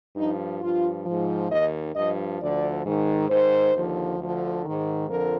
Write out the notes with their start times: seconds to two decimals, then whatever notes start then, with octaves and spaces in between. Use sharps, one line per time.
0.16 G2 F3 D#4
0.61 G2 F3 F4
1.06 G#2 F3
1.50 D#2 D#3 D#5
1.95 G2 F3 D#5
2.40 D2 D3 F3 D5
2.84 G#2 D#3
3.29 G#2 D#3 C5
3.73 D#2 D3 F3
4.18 D2 D3 F3
4.63 G#2 D#3
5.07 F2 D3 F3 A#4